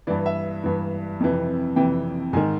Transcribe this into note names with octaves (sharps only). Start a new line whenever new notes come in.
G2 E3 D5
E5
G2 E3
F2 C3 E3
F2 C3 E3 G5
G#2 D#3 G#5